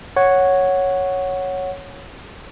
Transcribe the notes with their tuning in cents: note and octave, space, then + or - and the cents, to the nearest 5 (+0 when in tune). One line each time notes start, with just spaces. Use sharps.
C#5 +0 F#5 +0